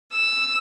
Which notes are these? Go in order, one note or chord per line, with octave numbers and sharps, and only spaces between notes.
E6